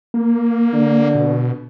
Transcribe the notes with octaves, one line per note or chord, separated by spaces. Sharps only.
A#3
D3
B2